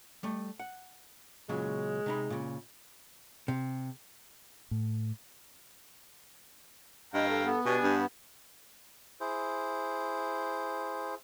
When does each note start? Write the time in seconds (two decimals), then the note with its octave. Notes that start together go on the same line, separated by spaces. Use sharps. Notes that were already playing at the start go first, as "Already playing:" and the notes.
0.23 G3 A3
0.60 F#5
1.49 A#2 C#3 F#3 G#3
2.06 C3 D#4 B5
2.30 A#2 C#3
3.48 C3
4.71 A2
7.14 G2 D#5 F5 G5 A#5
7.29 A4
7.45 B3 A4
7.65 B2 D4 G4 G#5
7.83 G2
9.20 E4 G#4 C5